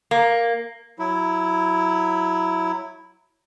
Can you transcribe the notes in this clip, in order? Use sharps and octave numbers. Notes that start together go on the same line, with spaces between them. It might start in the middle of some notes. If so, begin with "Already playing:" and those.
A#3
F#3 E4